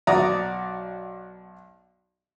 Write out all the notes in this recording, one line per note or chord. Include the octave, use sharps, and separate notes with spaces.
B1 F#4 D5 A#5 D#6